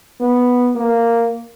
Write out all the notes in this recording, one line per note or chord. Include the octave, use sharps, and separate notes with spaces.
B3
A#3